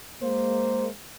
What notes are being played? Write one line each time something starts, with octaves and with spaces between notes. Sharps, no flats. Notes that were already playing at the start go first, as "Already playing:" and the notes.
G#3 A#3 C5